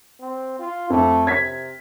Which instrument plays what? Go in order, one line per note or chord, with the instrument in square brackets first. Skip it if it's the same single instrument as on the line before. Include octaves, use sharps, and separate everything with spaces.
[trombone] C4
F4
[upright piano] F2 [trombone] A3
[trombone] C3 [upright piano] G#6 B6